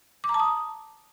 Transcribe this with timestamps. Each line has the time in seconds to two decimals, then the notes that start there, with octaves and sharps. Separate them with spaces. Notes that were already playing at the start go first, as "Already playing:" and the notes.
0.24 D6
0.29 A#5
0.34 A5
0.40 D#6